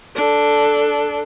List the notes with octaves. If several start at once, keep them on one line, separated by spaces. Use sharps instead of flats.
D4 A4